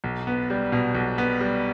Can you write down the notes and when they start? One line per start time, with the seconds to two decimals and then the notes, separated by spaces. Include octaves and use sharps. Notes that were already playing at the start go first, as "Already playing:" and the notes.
0.04 B1
0.27 B3
0.50 G3
0.72 B2
0.95 B1
1.18 B3
1.41 G3